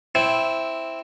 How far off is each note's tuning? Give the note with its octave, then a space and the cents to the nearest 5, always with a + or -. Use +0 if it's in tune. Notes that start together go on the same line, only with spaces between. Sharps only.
C4 +0 E4 +0